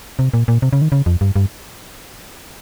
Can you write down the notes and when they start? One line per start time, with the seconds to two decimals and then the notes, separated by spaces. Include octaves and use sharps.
0.19 C3
0.34 A#2
0.48 A#2
0.62 C3
0.73 C#3
0.82 D#3
0.92 C#3
1.06 F2
1.21 G2
1.36 G2